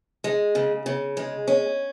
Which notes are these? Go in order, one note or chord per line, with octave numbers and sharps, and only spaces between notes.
G#3
C#3
C#3
G#3
C#4